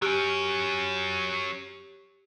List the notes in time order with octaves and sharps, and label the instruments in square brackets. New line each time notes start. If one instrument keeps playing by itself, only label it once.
[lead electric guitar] F#3 C#4 [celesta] G4 F6 D7